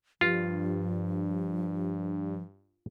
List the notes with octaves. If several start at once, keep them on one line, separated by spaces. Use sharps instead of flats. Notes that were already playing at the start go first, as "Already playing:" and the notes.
G2 F3 F4